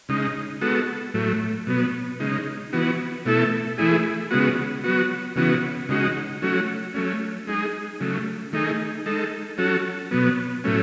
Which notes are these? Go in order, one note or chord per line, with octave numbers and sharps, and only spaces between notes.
C#3 G#3 D#4
G#3 B3 F#4 A4
A2 F#3 A3
B2 F#3 B3
C#3 G#3 D#4
E3 B3 F#4
B2 A3 E4 A4
E3 A3 E4 G#4
C#3 G#3 B3 F#4
F#3 B3 F#4
C#3 E3 B3 F#4
C#3 G#3 D#4 F#4
F#3 A3 C#4 F#4
F#3 A3 C#4
G#3 D#4 G#4
C#3 F#3 A3
D#3 A3 D#4 G#4
G#3 D#4 A4
F#3 C#4 F#4 A4
B2 F#3 B3
A2 F#3 A3 C#4